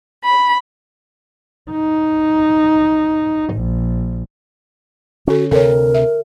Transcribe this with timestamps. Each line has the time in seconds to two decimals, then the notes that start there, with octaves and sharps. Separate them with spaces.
0.24 B5
1.71 D#4
3.54 A#1
5.28 D3 C#4 F#4 A4
5.51 D2 C3 A4 A#4 C#5
5.94 E5